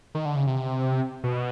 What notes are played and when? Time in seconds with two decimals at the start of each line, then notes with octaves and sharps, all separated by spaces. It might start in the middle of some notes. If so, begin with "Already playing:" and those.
0.15 D#3
0.25 D3
0.36 C#3
0.47 C3
1.24 B2